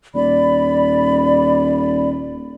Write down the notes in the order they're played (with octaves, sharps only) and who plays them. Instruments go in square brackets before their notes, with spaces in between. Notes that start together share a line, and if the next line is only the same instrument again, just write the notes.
[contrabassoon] D#1 [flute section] D5 B5